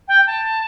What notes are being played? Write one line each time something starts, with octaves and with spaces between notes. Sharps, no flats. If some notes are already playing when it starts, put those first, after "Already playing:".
G5
A5